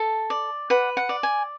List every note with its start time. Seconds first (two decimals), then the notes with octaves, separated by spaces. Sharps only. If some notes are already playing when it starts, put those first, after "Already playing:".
Already playing: A4 A5
0.30 D5
0.70 B4 F#5
0.97 F#5
1.09 D5
1.23 G#5